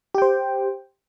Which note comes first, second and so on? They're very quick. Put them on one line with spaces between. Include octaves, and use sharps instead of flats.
G4 G5 C5